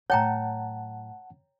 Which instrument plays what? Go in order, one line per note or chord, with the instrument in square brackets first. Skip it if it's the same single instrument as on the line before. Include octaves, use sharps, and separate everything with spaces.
[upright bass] A2 F#3 [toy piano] C#5 G5 A#5 [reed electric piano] F#5 A5